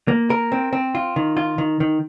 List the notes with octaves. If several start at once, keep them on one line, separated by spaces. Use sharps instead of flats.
A#3
A#4
C4
C4
F4
D#3
F4
D#3
D#3